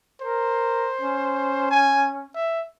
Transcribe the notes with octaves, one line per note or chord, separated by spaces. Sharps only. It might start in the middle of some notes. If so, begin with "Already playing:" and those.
A#4 C5
C#4
G#5
E5